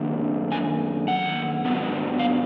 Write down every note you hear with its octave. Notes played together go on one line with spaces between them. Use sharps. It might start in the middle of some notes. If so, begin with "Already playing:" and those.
Already playing: F#2 D#3 A#3 D4
G#5
F#5
G#2 F#3 B3 D4
F5